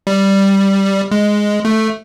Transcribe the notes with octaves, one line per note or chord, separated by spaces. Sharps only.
G3
G#3
A3